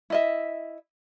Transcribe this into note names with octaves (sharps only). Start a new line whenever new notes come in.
E4 D#5 E5